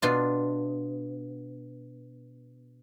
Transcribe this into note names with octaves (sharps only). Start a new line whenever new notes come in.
B2 D4 F4